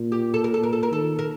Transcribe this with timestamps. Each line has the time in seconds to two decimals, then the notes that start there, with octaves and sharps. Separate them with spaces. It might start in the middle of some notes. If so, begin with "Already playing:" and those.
Already playing: A#2
0.12 G4
0.34 A4
0.44 A#4
0.54 A#2 A4
0.63 A#4
0.73 A4
0.83 A#4
0.91 D#3 A4
1.19 A#4